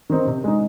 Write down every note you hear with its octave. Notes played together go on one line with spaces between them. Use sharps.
D#3 C4 D#4
C3
G#3 D#4